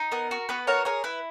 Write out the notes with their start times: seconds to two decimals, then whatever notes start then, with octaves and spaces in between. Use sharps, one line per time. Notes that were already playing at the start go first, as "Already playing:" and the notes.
Already playing: D#4
0.12 B3 A#4
0.31 F#4
0.49 B3 B4
0.67 F#4 A#4 C#5
0.85 G#4 A#4 C#5
1.04 E4 B4